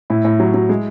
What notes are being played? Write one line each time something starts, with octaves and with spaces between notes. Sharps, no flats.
A2 E4
A2
F#3
F#3
G#3